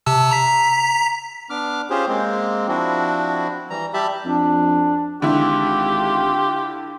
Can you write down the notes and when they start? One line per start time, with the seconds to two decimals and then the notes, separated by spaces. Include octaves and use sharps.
0.06 C3 A5 E6
0.31 A#5 B6
1.50 B3 D4 D6 F6
1.90 C#4 F4 G4 G#4 C5
2.08 G#3 A#3 C4
2.68 F3 C4 D4 E4 F#4
3.70 E3 G3 A#5
3.94 G3 G4 E5 A5 B5
4.25 F2 D4
5.22 G#1 D3 E4 F4 G4